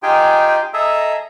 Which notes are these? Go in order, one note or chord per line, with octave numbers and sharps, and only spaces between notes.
D#4 F4 G4 G#4 G5 G#5
G#4 A4 D#5 E5 A#5